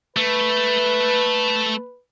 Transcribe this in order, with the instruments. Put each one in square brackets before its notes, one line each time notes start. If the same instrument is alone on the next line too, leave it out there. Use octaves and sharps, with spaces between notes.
[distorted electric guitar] A3 [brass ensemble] B4